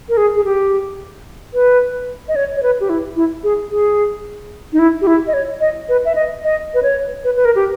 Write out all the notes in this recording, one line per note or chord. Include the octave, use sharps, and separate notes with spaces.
A#4
G#4
G#4
G4
B4
D#5
C#5
C#5
B4
G4
E4
E4
G#4
G#4
D#4
E4
G4
E4
D#5
C#5
D#5
B4
E5
D#5
D#5
B4
C#5
B4
B4
A#4
G4